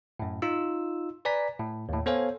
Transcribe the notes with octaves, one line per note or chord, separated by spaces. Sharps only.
F#2 A2
D#4 F4 E6
B4 D5 G#5 A#5 B6
A2
D#2 A2
B3 A4 C5 C#5 F5 G#5